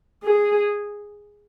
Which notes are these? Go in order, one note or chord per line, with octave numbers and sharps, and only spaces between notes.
G#4